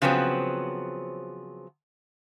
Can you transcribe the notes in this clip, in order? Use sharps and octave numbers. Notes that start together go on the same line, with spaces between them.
C#3 F3 F#3 B3 C4